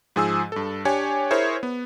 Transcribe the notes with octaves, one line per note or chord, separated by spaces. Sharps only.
G#2 F3 G#4 G#5 E6
G2 A4
D4 G4 C#5 G#5
E4 G#4 A#4 C5 C#5 E5
B3